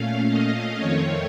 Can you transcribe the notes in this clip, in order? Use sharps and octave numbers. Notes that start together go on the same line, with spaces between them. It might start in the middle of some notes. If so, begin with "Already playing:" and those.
Already playing: A#2 A3 C#4 F5
D#5
F2 D#3 A3 C4 C#5